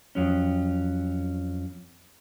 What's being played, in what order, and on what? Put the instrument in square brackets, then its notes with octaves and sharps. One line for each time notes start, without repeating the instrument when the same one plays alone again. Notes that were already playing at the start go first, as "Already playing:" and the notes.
[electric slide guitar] F2 F#3 C#4